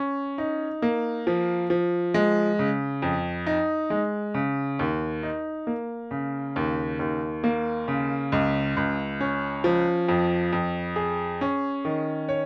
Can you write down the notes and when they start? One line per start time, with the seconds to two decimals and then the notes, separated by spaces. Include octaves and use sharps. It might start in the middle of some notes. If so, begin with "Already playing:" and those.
Already playing: C#4
0.38 D#4
0.82 A#3
1.27 F3
1.70 F3
2.14 G#3
2.59 C#3
3.02 F2
3.47 D#4
3.90 G#3
4.34 C#3
4.79 D#2
5.23 D#4
5.67 A#3
6.11 C#3
6.56 D#2
6.99 D#2
7.44 A#3
7.88 C#3
8.32 C#2
8.77 C#2
9.21 C#4
9.64 F3
10.09 F2
10.53 F2
10.96 G#4
11.41 C#4
11.85 D#3
12.29 C#5